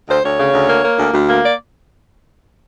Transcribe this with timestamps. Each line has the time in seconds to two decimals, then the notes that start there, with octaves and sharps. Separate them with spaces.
0.09 D2 C5
0.23 D2 C#5
0.38 C#3
0.53 D2
0.68 A#3
0.83 A#3
0.98 D2
1.13 D2
1.28 A#3
1.42 D5